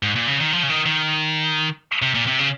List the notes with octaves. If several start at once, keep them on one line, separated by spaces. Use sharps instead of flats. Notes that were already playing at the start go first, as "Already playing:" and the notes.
G#2
A#2
C#3
D#3
F3
C#3
D#3
D#3
C3
A#2
C3
C#3